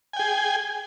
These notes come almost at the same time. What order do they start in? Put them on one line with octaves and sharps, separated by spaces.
G#5 G5 G#4